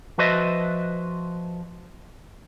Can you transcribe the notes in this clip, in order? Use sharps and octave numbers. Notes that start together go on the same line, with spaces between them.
F3 F#4 B4 C5 D#5 E5